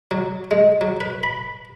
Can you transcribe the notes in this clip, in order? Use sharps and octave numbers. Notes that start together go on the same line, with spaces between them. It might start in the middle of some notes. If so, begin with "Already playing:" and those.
F#3
G#3
F#3
B4
B5